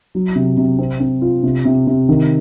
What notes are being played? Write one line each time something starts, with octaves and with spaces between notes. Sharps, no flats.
F#3
C3
C3
C4
C4
F4
C3
C3
C3
D#3